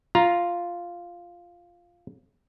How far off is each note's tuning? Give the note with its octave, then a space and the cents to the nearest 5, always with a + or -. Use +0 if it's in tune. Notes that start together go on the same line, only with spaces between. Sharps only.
F4 +0 A#5 +10